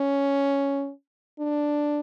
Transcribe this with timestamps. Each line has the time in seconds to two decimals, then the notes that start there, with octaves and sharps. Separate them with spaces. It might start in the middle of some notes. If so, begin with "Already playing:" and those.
Already playing: C#4
1.39 D4